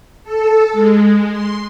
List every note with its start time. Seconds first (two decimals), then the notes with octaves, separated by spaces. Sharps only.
0.24 A4
0.73 G#3
1.31 C6